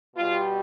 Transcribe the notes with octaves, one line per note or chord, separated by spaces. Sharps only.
B2 G3 F4